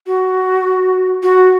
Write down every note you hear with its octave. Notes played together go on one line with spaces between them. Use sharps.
F#4
F#4